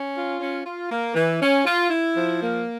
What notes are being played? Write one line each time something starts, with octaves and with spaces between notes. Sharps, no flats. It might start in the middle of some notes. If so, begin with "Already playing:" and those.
Already playing: C#4
F4
C#4
F4
A#3
E3
C#4
F4
E4
F3
A#3